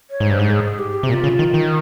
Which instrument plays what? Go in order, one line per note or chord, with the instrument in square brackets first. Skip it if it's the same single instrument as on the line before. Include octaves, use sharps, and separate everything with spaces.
[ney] C#5
[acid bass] G#2
[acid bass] G2 [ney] C5
[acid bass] G#2
[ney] G#4
G4
[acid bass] C3
[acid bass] A#2 [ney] F4
[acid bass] C#3
D#3
D#3